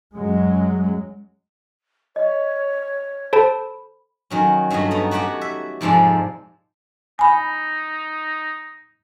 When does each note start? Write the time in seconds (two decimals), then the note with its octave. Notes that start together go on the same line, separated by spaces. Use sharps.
0.17 F#2 F#3 G#3
2.16 C#5 D#5
3.33 A4 C5 A5 B5
4.30 D#3 F#3 C#4
4.70 G2 F#3 A3 F#4 D#5
4.91 B3 D#4
5.11 F#4 G4 C#5 F#5 G5
5.41 E5
5.81 F2 G#2 C3 F3 G#3 D5
7.19 D#4 G#5 B5